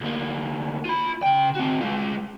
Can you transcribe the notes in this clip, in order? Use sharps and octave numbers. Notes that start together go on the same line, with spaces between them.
D2 A#3
F4 B5
C#3 G5
C4 F#4
G#3 F4